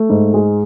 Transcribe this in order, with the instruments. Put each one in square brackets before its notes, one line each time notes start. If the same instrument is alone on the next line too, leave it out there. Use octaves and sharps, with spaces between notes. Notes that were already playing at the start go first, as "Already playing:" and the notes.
Already playing: [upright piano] A3
G#2
G#3